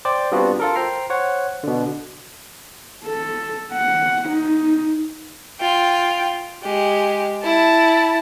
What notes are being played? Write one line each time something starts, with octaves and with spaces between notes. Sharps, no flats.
C5 D5 G5 D6
G3 B3 C4 D4 F4 F#4
F4 A4 A#4
C5 G5 A#5 C7
C5 C#5 F#5
B2 D3
A4
F#5
D#4
F4 G5
G#3 G4
E4 A5